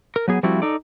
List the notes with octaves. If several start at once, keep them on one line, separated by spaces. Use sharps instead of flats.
A#4
F#3 B3 G#4
F3 G3 A3 C4 E4 F#4
D#4 A4 D5